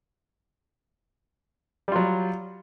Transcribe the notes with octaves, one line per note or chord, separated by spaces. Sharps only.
F#3 G3 F4